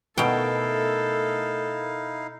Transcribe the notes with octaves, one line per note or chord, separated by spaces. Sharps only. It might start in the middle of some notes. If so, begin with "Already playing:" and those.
B2 A3 D#4 E4 A4 A#4 F5 G5